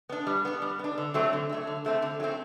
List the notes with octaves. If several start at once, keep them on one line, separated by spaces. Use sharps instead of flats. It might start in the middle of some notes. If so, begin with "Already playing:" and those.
B3 D4
G3
B3 D4
G3
B3 D4
D3
F#3 A3 C4
D3
C4
F#3 A3
D3
F#3 A3 C4
D3
F#3
A3 C4